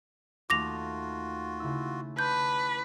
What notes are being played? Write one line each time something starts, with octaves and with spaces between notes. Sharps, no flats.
D#2 A3 F4 F#4 D6 A#6 F7
C#3 E4 E6
B4 A5 C6 D6 G6